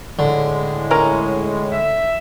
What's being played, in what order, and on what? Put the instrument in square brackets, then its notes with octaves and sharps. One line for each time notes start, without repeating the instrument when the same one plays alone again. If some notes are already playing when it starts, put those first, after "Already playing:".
[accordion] A2 G#3 [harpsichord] D3
[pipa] C#4 A#4 A#5
[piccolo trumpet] E5